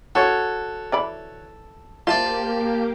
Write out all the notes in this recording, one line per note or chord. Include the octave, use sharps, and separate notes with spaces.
C#4 F#4 A4 C#5 C#6
E3 D5 B5
A#3 F4 G4 C5 D5 E5 A5 C6